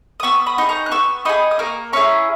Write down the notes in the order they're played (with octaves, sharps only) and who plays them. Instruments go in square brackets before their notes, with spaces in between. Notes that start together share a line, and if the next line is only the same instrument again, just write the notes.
[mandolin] D#6
B3 C#6 E6
B5 D#6
D#4 G#4
A#5 C#6
F#6
B3 C#6 E6
D#4 G#4 B5 D#6
D#6
A#3 A#5 C#6
C#4 E4 G#4 A#5 C#6